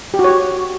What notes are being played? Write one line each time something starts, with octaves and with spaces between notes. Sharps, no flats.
G4
F#4
C#5